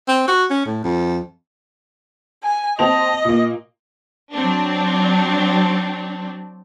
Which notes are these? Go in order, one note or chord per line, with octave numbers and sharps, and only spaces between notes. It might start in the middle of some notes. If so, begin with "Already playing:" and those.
C4
F#4
C#4
A2
F2
G#5
C4 D#5 A5 F7
A#2 A#3
F#3 C4 D4